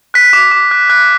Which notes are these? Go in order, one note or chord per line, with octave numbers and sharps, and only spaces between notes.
F#6 B6
D6
D6
F#6
F#6